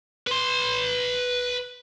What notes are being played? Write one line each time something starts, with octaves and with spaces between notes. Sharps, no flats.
B4 C6